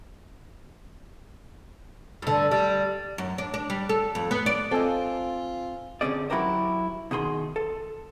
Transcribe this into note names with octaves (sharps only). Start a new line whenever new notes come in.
G2 D3
G3
F#2
D4
D4
G3
A4
F2
B3
D5
C4 F4 A4 D#5 F5 G#5 E6
D3 C4 C#4 G#4 D5
F#3 E4 F#4 G4 A#4 C5
B2 D#3 G#4 C6
A4